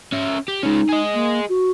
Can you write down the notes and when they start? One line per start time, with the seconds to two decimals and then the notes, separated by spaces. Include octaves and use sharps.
0.12 C#4 E5
0.48 G4
0.63 G#3 C#4 D#4
0.89 G#4 D#5
1.13 A#3
1.48 F#4